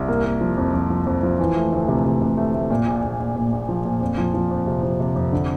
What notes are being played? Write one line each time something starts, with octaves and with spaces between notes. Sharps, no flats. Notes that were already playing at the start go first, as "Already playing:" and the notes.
Already playing: C2
A#3
A#3
F3
F2
F2
F3
F2
F3
E3
A3
D2
C3
C3
C3
A3
A3
A#2
A#1
A#1
A#1
A#2
A#1
F3
A#2
F2
F3
F3
F2
C3
F3
C3
F2
D3